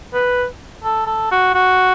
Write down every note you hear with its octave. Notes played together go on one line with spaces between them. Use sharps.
B4
A4
A4
F#4
F#4